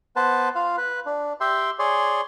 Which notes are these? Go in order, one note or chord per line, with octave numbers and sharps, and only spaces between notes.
B3 B4 C5 A5
F4 F5
B4
D4
G4 E5 G5 C6
G#4 C#5 D5 C6